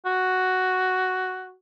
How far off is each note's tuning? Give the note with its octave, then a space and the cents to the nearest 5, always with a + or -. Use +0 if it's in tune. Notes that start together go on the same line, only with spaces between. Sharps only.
F#4 +5